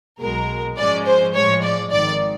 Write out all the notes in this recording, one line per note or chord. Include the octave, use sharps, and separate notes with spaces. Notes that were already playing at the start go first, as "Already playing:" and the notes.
B1 B2 G#3 A#4
G#2 F3 G#3 C#4 D5
C5
A2 F3 G#3 C#5
D5
G#1 G#2 D#3 D5